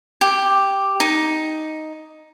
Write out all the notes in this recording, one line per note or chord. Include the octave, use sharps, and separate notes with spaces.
G4
D#4